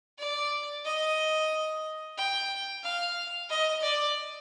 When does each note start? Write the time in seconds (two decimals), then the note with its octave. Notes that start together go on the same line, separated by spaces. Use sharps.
0.19 D5
0.85 D#5
2.18 G5
2.83 F5
3.50 D#5
3.82 D5